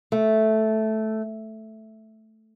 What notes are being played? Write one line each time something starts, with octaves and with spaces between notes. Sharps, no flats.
A3